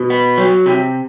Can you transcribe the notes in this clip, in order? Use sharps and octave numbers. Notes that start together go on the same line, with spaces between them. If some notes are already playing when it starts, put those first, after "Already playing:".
Already playing: B2
B3
F#3
C3